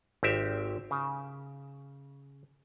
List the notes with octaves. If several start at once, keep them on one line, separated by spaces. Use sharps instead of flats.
G#1 C4 G4 E5
C#3